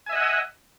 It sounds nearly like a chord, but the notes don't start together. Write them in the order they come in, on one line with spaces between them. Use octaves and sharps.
G#5 E5 D#5 F#5